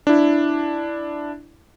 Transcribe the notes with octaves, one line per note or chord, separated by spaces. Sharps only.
D4 E4